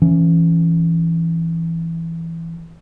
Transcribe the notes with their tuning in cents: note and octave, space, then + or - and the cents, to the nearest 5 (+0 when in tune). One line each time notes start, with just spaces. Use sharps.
E3 +10 C#4 +0